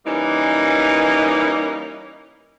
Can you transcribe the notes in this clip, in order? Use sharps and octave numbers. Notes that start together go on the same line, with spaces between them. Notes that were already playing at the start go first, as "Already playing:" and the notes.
E3 G3 A#3 C#4 D#4